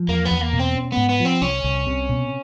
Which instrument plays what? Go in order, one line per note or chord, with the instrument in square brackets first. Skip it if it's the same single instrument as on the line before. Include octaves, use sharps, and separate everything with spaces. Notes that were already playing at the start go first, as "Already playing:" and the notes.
Already playing: [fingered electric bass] F3
[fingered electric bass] E2 [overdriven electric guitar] A#3
[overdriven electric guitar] B3
[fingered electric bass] E2
[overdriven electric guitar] A#3
[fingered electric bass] B2
[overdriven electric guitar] C4
[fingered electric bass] C#4
[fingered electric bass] G#2 [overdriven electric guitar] B3
[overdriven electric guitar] B3
[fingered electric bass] F3 [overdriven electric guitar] C4
[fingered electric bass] C2 [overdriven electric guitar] C#4
[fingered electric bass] C2
C3
B2